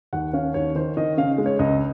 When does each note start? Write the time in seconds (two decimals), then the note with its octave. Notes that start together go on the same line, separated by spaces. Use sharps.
0.13 D#2 F#5
0.33 C#4 F5
0.54 D#2 C#5
0.75 D#3 C5
0.97 D#3 D#5
1.17 C#3 F5
1.38 G#3
1.46 C#5
1.59 C#2 D#5